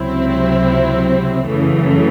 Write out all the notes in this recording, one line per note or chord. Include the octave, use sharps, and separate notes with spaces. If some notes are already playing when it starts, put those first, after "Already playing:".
Already playing: C#2 C3 F#3 C4 E4
F#2 C#3 E3 A3